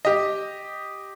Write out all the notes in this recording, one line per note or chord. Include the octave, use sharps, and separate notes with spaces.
G4 D#5